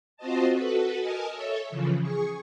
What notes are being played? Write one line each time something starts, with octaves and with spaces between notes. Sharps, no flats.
C4 F4 F#4 C5 D#5 A5
F#4 A4 B4
A#4 D#5 G#5 A5
A4 C#5 E5
C#3 E3 F3
G#4 C#6